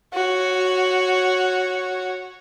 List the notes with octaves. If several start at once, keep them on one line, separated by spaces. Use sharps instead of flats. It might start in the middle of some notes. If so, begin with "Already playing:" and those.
F#4 C#5